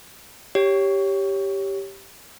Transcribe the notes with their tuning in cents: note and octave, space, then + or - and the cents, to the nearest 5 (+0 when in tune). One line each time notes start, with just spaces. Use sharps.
G4 +0 C#5 +0